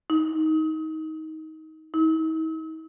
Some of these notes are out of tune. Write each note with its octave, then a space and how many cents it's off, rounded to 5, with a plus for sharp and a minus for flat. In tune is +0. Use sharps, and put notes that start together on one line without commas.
D#4 +20
D#4 +45